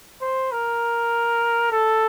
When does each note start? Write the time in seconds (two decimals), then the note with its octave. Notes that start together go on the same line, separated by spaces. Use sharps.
0.21 C5
0.52 A#4
1.72 A4